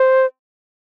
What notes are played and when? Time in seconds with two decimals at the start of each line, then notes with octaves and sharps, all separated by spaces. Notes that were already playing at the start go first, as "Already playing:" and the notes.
Already playing: C5